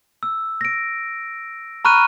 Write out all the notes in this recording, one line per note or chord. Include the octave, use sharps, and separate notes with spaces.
E6
A#6 D7
A#5 B5 C#6 F6 F#6 D#7